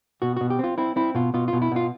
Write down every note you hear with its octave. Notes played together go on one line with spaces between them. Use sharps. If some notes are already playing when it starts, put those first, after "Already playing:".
B2 F#4
B2 F#4
G4
C4 F4
C4 E4
C4 E4
B2 F4
B2 F4
F4
B2
E4
B2 F4